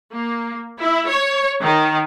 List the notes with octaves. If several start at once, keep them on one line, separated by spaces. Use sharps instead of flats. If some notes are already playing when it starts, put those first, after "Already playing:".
A#3
E4
C#5
D#3